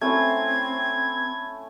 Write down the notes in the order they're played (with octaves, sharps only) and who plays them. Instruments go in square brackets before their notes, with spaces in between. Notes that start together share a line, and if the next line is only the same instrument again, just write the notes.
[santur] A3 C#4 E4 [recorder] C4 [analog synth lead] G#6